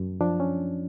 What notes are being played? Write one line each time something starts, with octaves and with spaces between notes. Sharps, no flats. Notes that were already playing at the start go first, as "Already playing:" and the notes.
Already playing: F#2
F3 D4
C#4